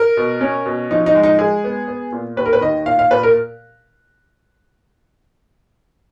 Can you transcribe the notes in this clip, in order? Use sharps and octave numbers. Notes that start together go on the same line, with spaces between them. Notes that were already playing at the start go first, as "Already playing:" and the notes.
Already playing: A#4
B2
C#4
B2
F3 D#4
D#4
G#3
D#4
G#3 G#4
B3
B3
A#2
D#2 B4
A#4
B4
D#3 D#5
A#2 F5
F5
A#2 B4
A#4